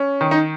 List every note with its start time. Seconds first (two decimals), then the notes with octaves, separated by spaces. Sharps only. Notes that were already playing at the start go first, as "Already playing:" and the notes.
Already playing: C#4
0.21 D#3
0.31 D#4